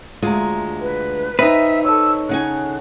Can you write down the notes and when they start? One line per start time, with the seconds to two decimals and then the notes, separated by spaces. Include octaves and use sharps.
0.22 D2 G#3 F4 E5 A#5
0.81 B4
1.39 C4 D#4 B4 D#5 E5 G5
1.84 A4 C#5 E6
2.29 C#3 D#4 F#5 G#5 F#6